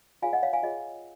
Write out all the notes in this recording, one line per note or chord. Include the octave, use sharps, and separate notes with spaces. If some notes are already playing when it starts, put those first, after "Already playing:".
F4 G#4 C#5 F5 G#5
D#5 F#5
C#5 F5
F5 G#5
F4 G#4 C#5 D#5